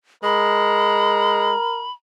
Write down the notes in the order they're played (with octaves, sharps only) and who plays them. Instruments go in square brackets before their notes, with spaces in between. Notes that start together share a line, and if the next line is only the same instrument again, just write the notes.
[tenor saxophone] G#3 [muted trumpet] A#4 [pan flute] B5